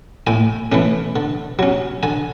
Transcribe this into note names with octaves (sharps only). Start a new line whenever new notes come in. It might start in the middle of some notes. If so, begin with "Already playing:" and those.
A2 G#5
E3 A3 C#4
D3
F#3 C#4
D3 G#5